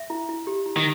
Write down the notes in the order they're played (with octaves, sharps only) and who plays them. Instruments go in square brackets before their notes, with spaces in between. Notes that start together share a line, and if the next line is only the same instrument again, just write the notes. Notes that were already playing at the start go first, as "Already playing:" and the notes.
Already playing: [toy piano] E5
E4
E4
G4
E4
[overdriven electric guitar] D#3